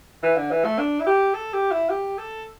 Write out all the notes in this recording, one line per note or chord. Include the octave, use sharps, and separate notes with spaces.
E3
D3
E3
A3
D4
E4
G4
A4
G4
E4
G4
A4